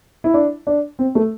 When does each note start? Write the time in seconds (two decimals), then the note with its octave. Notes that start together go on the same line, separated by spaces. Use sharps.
0.24 E4
0.34 D4
0.67 D4
0.99 C4
1.15 A3